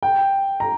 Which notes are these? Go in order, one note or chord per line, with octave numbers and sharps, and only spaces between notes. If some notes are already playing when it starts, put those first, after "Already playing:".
G5
A#5